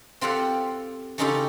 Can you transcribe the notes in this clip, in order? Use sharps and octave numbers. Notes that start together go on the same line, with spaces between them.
C4 F4 G4 A4 F#5
C#3 C#4 D#4 F4 G4 A4